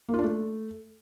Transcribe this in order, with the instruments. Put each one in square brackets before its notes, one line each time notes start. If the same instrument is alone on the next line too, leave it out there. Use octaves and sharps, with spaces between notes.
[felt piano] A#3
F4
D4
A3